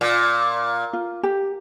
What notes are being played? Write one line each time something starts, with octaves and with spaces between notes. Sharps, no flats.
A#2
F4
G4